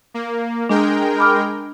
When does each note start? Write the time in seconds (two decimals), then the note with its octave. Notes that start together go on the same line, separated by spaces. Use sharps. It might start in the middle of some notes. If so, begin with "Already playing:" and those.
0.14 A#3
0.69 G#3 D4 A#4 G5
1.18 B5 D6 F6